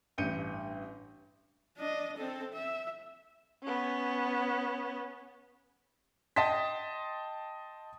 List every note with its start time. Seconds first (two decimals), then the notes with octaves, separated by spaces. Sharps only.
0.18 A1 G2 G6 C#7 D#7
1.77 D4 D#5
2.17 C4 A4
2.53 E5
3.63 B3 C#4
6.36 D#5 G5 A5 C6 B6